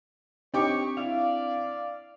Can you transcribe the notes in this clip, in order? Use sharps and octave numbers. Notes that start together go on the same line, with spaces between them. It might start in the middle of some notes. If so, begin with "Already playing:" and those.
C4 D4 D#4 G4 C#5 C#6 D6
E4 D5 F5